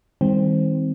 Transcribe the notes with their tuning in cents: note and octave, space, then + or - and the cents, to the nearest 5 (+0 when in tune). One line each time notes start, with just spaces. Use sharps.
D#3 +30 G3 +45 C4 +0